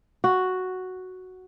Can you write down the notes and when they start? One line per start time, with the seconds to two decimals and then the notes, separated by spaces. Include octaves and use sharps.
0.24 F#4